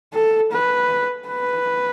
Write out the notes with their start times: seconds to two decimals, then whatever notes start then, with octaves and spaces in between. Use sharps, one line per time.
0.14 A4
0.52 B4
1.28 B4